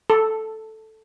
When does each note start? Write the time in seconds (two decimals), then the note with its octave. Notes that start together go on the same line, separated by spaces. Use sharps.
0.10 A4